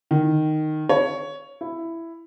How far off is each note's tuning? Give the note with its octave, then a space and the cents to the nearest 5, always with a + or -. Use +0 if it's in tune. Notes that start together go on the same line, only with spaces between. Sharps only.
D#3 -5
C#5 +10
E4 +10